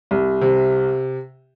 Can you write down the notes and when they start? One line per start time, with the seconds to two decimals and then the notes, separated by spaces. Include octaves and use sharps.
0.11 C2
0.41 C3